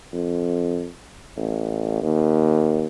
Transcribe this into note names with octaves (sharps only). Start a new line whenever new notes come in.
F2
A1
D#2